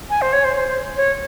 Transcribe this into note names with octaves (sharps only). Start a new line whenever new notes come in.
G#5
C5
C#5
C5
C5
C5
C#5